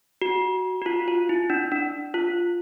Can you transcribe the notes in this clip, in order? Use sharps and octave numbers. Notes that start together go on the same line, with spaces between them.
F#4
F#4
F4
F4
E4
D4
D4
F4